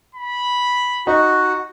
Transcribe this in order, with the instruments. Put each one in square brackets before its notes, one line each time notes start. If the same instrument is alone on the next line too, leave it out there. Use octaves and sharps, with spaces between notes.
[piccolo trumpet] B5
[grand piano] D#4 [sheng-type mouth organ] F#4